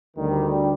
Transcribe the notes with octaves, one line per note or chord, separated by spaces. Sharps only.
D2 D3 D#3 G3